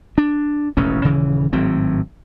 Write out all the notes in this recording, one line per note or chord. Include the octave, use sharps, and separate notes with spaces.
D4
E1 A1 D#2 C#4
D#1 C#3 E3
G#1 A2 F#3 C4